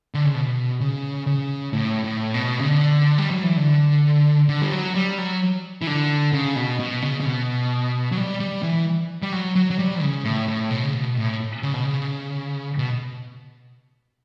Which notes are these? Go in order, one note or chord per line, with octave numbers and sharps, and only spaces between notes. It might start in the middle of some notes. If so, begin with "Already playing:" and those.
D3
C#3
B2
C#3
C#3
A2
A2
B2
C#3
D3
G3
F#3
E3
D3
D3
G3
F#3
G3
F#3
E3
D3
C#3
B2
B2
C#3
C#3
B2
F#3
G3
G3
E3
G3
F#3
F#3
F#3
G3
C#3
A2
A2
B2
C#3
B2
A2
C#3
B2
C#3
B2